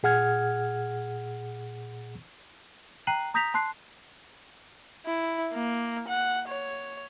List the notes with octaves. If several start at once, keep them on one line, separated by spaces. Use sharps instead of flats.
A#2 G#4 F#5 F6 G#6
G5 A#5 F#6 C7 D#7 F#7
A#5 D#6 G6 A#6 B6 F7
A5 C6 F#6 C7
E4
A#3
F#5
C#5